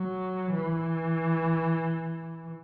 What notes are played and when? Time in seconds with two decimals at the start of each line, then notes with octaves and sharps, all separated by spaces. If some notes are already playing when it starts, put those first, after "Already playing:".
Already playing: F#3
0.51 E3